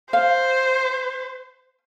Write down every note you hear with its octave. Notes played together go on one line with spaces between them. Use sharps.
C5 F5